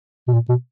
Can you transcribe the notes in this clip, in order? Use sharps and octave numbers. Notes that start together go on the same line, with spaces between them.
B2
A#2
B2